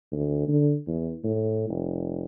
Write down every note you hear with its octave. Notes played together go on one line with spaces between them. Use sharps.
D2
D3
E2
A2
F1